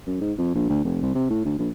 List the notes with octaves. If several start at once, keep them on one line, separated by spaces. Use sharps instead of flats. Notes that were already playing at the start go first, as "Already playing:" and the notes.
F#2
G#2
F2
A#1
D2
F1
C2
C3
A2
D2
A#1